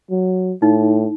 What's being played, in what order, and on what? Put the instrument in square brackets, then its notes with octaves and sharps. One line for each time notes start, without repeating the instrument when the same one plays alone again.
[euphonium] F#3
[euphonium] A2 [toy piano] D#4